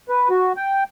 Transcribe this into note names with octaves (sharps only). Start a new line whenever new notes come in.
B4
F#4
G5